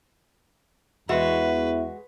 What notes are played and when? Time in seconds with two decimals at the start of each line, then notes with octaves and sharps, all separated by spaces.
1.09 E2 G#3 F#4 B4 E5